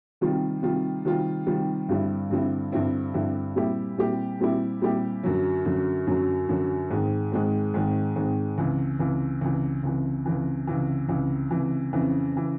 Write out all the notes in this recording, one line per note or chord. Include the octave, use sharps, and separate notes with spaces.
C3 D#3 G3 C4 F4
C3 D#3 G3 C4 F4
C3 D#3 G3 C4 F4
C3 D#3 G3 C4 F4
G2 D3 G3 C4 E4
G2 D3 G3 C4 E4
G2 D3 G3 C4 E4
G2 D3 G3 C4 E4
A#2 G3 C4 E4 G4
A#2 G3 C4 E4 G4
A#2 G3 C4 E4 G4
A#2 G3 C4 E4 G4
F#2 D3 F#3
F#2 D3 F#3
F#2 D3 F#3
F#2 D3 F#3
G#2 D#3 G#3 C4
G#2 D#3 G#3 C4
G#2 D#3 G#3 C4
G#2 D#3 G#3 C4
C#2 C3 E3
C#2 C3 E3
C#2 C3 E3
C#2 C3 E3
C#2 C3 E3
C#2 C3 E3
C#2 C3 E3
C#2 C3 E3
F2 C#3 E3
C#3 E3